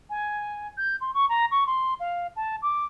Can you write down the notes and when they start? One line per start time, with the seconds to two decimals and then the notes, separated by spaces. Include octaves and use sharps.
0.09 G#5
0.77 G6
1.00 C6
1.14 C#6
1.29 A#5
1.51 C#6
1.66 C6
1.99 F5
2.36 A5
2.62 D6